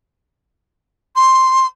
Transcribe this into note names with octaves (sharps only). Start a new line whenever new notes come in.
C6